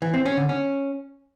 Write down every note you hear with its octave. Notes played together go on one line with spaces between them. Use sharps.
E3
C4
C#4
D3
C#4